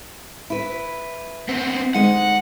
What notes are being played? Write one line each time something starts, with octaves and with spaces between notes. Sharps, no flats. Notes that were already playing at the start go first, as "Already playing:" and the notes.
E4 B4
B3 C4
D2 G#3 D#4 F#5